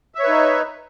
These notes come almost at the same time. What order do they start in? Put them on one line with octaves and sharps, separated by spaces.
E5 C#5 B4 D#4